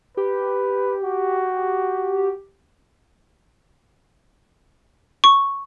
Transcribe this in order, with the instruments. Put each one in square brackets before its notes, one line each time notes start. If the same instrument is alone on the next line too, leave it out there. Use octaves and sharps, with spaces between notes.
[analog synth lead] G4 [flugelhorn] B4
[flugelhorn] F#4
[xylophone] C#6